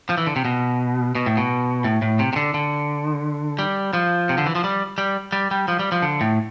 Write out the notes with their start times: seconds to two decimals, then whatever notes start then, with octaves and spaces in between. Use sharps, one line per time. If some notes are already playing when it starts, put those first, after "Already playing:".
0.09 F3
0.17 E3
0.27 D3
0.36 C3
0.45 B2
1.15 B2
1.26 A2
1.37 B2
1.84 A2
2.02 A2
2.19 C3
2.33 C3
2.36 D3
2.54 D3
3.59 G3
3.93 F3
4.29 C3
4.38 D3
4.46 E3
4.55 F3
4.64 G3
4.98 G3
5.32 G3
5.51 G3
5.68 F3
5.79 G3
5.92 F3
6.02 D3
6.21 A2